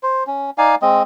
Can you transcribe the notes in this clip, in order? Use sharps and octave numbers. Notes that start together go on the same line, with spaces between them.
C5
C#4
D#4 D5 F5 G#5
G#3 C4 D#5